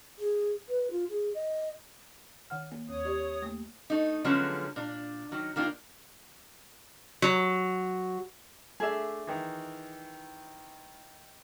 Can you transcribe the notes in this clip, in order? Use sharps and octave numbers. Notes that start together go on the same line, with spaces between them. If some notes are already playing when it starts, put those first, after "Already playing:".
G#4
B4
F4
G#4
D#5
D#3 F#5 F6
A#3
D#2 C#5 D#6
G4 D5
A3 A#3
A3 D#4
D3 F3 F#3 G#3 B3 C#4
A#2 D4
D#3 F#3
D#3 A#3 D4 F4
F#3
A3 D4 G#4 E5
D#3 E3